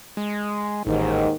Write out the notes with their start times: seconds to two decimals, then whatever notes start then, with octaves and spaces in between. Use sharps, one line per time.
0.17 G#3
0.87 A1 D#2 G#2 D#3